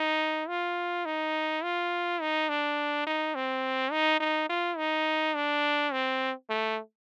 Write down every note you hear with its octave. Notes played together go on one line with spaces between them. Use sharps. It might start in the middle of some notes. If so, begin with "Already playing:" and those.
Already playing: D#4
F4
D#4
F4
D#4
D4
D#4
C4
D#4
D#4
F4
D#4
D4
C4
A3